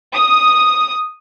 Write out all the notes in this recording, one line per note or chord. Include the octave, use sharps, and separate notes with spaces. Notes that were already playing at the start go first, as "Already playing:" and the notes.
D#6